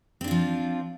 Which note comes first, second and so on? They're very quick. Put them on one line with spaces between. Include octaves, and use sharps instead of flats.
C4 D4 F4 F3